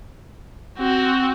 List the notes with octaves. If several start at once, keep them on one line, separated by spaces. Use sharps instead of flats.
C4 F#4